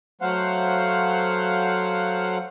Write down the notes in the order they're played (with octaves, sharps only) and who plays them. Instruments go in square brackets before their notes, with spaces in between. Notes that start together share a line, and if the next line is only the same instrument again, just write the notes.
[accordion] F#3 A3 C5 F5 F#5